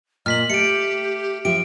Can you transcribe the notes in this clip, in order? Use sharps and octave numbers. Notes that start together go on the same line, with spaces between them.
A#2 D#5 F6 B6 F#7
A3 G4 C#7 D7
F3 G4 E5 D7